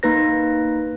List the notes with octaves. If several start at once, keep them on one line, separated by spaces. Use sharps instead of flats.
A#3 D#4 B4 A#6